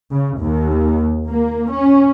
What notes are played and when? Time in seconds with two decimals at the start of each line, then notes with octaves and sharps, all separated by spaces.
0.12 C#3
0.41 D#2
1.29 A#3
1.73 C#4